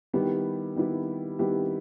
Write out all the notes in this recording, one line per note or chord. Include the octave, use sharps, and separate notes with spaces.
D#3 G3 B3 E4 G4
D#3 G3 B3 E4 G4
D#3 G3 B3 E4 G4